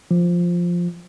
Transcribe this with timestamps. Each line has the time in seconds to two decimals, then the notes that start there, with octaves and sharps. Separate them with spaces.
0.11 F3